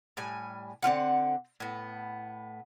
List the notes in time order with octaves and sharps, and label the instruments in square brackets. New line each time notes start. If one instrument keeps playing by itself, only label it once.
[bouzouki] A2 G3 G#5
D3 C4 F4 F#5
A2 B3